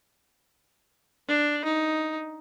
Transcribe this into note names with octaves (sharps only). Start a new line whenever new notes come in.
D4
D#4